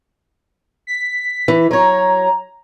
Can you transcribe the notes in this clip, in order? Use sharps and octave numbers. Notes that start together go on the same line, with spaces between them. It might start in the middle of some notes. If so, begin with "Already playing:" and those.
B6
E3
F#3 C#5 A#5